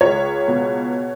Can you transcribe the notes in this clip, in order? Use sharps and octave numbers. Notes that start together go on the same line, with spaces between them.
C#2 C#5
B2